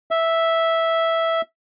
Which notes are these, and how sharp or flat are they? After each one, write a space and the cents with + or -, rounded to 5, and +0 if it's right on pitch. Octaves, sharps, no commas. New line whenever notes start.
E5 -5